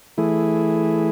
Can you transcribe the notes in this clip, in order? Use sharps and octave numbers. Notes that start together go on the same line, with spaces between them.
E3 A3 E4 G#4